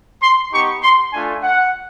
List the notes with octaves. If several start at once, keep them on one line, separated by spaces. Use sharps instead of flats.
C6
B3 D#4 G4 C#6
C6
A3 D4 F4 G#5
F#5